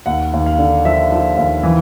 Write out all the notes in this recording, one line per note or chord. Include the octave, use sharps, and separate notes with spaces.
D#2 F#5
D#2
F5
D3
F3 E5
F3
D#2
E3